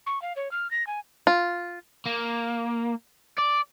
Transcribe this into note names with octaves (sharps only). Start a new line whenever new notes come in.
C#6
F5
C#5
F6
A#6
G#5
F4
A#3
D5